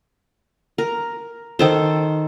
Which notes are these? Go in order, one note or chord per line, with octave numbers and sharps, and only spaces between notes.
A#4
D#3 A4 C5